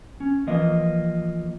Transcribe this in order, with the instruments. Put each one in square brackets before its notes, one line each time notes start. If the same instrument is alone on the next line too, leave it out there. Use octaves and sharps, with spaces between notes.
[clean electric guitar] C#4
E3 F3 A#3 F4 D#5